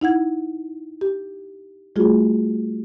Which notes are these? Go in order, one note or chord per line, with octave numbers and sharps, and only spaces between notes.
D#4 E4 F#5 G#6
G4
G3 A3 F4 F#4 G#4